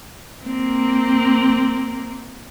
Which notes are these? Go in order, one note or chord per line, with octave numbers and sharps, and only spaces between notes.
A#3 C4